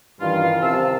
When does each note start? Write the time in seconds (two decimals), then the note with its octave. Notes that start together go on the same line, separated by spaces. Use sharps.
0.21 G2 D#3 E3 C#4 E4 F4 F5
0.62 C2 C3 A5 E6